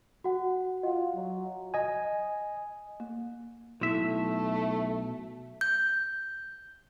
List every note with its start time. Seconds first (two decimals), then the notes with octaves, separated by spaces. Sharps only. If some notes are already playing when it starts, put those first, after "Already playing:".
0.24 F#4 F#5
0.83 F4 D#5 F#5
1.15 F#3
1.74 D#5 G#5
3.00 A#3
3.81 B1 A3 E4 E5
5.61 G6